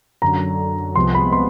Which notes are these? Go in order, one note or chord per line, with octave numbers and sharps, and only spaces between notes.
F#2 D3 F#3 A#5
C2 C3 F3 G#3 B3 C6
B5
C6